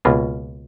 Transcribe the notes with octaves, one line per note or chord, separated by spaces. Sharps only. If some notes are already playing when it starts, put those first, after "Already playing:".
C#2 B2 A#3 F4